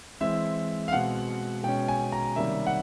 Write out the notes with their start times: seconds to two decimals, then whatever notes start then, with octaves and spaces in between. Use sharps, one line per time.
0.21 E3 G#3 C4 E5
0.88 F5
0.91 B2 G#3 C4 F#5
1.63 B2 G#3 C#4 G5
1.88 G#5
2.12 A#5
2.36 C3 D#3 G3 A#3 C#4 E5
2.67 F#5